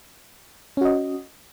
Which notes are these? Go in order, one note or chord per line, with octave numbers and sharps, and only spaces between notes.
C#4 F#4 D#5